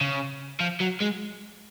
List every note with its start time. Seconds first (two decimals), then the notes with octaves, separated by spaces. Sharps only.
0.01 C#3
0.60 F3
0.80 F#3
1.01 G#3